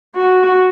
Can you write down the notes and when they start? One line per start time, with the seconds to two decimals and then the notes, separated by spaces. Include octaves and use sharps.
0.16 F#4